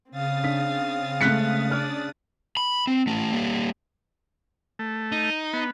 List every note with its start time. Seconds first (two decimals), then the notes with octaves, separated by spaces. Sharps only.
0.11 C#3 C4 F5 D#6 A6
0.44 D4 B6
1.21 G#3 A3 F#6 B6 C#7
1.71 D4 D5 F6
2.57 B5
2.87 C4
3.07 A3 C#4
3.32 G3 A#3
4.79 A3
5.12 D#4
5.53 B3